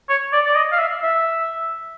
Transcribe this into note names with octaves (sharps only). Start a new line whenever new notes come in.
C#5
D5
D5
D#5
F5
E5
E5